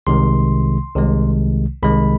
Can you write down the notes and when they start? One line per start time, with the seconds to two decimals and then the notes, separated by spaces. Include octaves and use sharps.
0.07 C2 C3 D#3 G#3 C6
0.95 C2 C3 D#3 G#3
1.83 C2 C3 D#3 G#3 B5